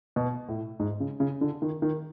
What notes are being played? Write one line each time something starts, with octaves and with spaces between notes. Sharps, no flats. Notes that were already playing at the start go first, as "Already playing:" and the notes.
B2
A2
G#2
C#3
C#3
D3
D#3
D#3